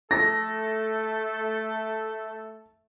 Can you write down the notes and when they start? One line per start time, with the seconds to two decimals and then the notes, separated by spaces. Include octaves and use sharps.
0.11 A3 A4 A#6